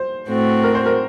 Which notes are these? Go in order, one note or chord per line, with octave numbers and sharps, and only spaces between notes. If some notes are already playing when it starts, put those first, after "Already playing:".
Already playing: C5
A2 A3 C4 F#4
A#4
C5
A#4